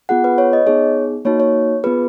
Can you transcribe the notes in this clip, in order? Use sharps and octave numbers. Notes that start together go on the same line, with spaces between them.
B3 F4 G#4 F#5
B4
C#5
D#5
B3 D#4 G#4 C#5
A#3 D#4 F#4 C#5
C#5
B3 F4 G#4 B4